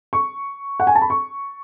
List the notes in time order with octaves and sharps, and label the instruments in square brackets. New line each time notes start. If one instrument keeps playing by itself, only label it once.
[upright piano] C#6
F#5
G#5
A5
B5
C#6